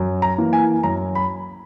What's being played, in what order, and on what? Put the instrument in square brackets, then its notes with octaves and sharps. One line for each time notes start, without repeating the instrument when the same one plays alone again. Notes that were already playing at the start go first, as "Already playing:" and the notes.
Already playing: [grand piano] F#2
A#5
E3 A#3
G#5
F#2 A#5
B5